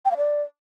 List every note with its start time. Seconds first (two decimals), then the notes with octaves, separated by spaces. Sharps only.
0.05 G5
0.11 F5
0.17 D5